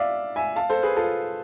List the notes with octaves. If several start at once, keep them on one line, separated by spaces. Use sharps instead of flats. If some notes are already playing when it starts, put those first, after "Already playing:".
Already playing: D5 E5 F5
E5 G#5
F5 A5
A4 C5
G#4 B4
F4 A4